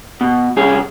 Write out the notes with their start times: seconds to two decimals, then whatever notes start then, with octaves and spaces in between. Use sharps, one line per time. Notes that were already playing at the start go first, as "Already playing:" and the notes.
0.21 B2
0.57 C2 C#4 G#4